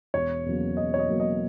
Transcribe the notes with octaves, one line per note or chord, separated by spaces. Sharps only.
E1 C#5
E2 C#3 F#3 A#3
E1 D#5
C#5
D#5
E2 C#3 F#3 A#3
D#5